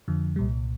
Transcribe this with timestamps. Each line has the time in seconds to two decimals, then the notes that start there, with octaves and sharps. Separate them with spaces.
0.08 F2 D3 F3
0.36 C2 A#2 G3